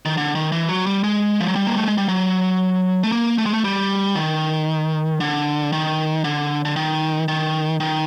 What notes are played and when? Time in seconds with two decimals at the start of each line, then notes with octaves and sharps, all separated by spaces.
0.05 D#3
0.17 D3
0.35 D#3
0.52 E3
0.69 F#3
0.86 G3
1.04 G#3
1.41 F3
1.48 F#3
1.56 G3
1.67 A#3
1.77 A3
1.88 G#3
1.98 G3
2.09 F#3
3.03 A3
3.12 A#3
3.38 A3
3.46 G#3
3.53 A3
3.64 G3
4.15 D#3
5.20 D3
5.72 D#3
6.24 D3
6.65 D3
6.76 D#3
7.28 D#3
7.80 D#3